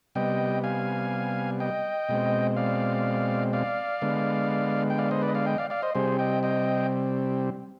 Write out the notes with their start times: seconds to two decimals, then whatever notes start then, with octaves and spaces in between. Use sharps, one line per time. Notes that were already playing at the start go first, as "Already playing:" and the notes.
0.15 C3 G3 B3 D#5 G5
0.64 F5 G#5
1.60 D#5 G5
2.09 B2 G#3 C4
2.57 D5 F5
3.53 D5 F5
4.02 D3 G#3 B3
4.90 G5
4.98 D5 F5
5.11 C5 D#5
5.22 B4 D5
5.28 D#5
5.34 D5 F5
5.46 D#5 G5
5.58 D5 F5
5.70 D5 F5
5.82 C5 D#5
5.95 C3 G3 C4 G#4 C5
6.19 D#5 G5
6.43 D#5 G5